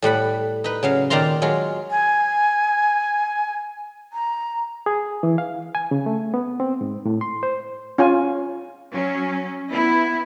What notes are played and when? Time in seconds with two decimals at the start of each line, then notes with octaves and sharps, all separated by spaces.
0.02 A2 G3 F#5 B5
0.64 D#4 B4
0.83 C#3 F#3 F5
1.10 A#2 D#3 D5 F5 A#5 C6
1.42 F#3 G#3 F4
1.91 G#5
4.13 A#5
4.86 G#4
5.23 E3
5.38 F5
5.75 G#5
5.91 C#3
6.06 A3
6.34 B3
6.60 C4
6.81 G#2
7.05 A2
7.21 C6
7.43 C5
7.98 C#4 F4 G#5
8.90 F#3 C#4
9.70 B3 E4